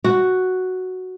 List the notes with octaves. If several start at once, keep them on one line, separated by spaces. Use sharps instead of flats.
F#4